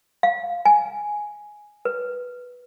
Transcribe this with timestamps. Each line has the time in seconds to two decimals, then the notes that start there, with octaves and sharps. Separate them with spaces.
0.23 F5
0.65 G#5
1.85 B4